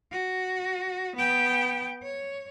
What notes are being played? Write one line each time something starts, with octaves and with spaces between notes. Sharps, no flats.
F#4
B3 G5
C#5